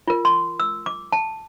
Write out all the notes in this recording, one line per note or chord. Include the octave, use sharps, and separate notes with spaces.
F4 A#4
C6
E6
D6
A5